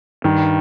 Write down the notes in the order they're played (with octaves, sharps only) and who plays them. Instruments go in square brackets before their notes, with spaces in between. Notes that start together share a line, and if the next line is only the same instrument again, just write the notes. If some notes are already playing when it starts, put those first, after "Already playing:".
[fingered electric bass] G2 [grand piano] D#3